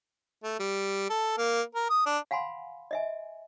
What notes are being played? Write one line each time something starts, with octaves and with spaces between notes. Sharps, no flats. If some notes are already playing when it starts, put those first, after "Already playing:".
A3
G3
A4
A#3
A#4
D#6
D4
F5 F#5 G#5 B5 C6
D#5 E5 G#5